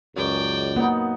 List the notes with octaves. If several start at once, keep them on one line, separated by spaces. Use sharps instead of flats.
C#2 F#2 D5 G5
A#3 B3 D#4